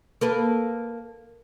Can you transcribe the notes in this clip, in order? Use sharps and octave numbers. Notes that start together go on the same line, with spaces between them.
A#3 A4 B4